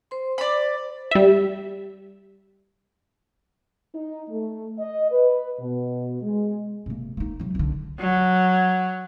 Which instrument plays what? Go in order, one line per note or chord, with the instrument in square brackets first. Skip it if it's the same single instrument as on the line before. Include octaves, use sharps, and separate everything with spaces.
[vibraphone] C5 C6
[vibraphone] C5 [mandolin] D5 B5
[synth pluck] G3 E5
[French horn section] D#4
A3
D#5
B4
B2
G#3
[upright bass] C3 A#3
A#3 D#4
C3 F#3
C2 D3
[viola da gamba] F#3